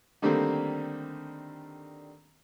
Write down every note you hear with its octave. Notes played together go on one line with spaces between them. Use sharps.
D3 D#3 G3 A3 A#3 C4